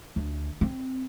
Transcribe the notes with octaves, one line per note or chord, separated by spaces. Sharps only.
D2
C4